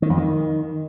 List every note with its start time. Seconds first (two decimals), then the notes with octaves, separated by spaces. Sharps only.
0.02 D#3
0.10 F2
0.17 D#3